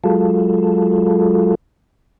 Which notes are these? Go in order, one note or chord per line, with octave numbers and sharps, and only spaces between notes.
F#3 G#3 F4 A4